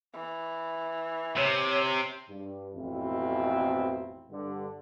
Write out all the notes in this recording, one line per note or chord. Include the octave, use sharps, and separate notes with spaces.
E3
C3 C#5
G2
A1 F2 B2 C4 E4
G2 D3